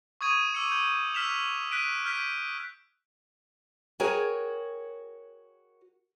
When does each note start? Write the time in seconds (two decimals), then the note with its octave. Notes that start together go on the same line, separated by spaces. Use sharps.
0.21 C#6 D#6 G#6 D#7
0.54 D6 E6 C#7
0.72 G6
1.14 E6 F6 B6 E7 F7
1.71 F#6 B6 D7 D#7
2.06 F6 G6 B6 D7
4.00 F#4 G#4 A#4 C#5 G5 G#5